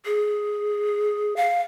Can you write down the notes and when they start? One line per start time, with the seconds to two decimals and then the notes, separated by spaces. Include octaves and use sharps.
0.06 G#4
1.36 F5